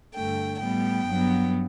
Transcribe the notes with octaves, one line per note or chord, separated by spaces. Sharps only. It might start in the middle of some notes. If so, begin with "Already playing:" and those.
G2 D3 A3 G5
A2 G3 B3 G5
G2 F#3 B3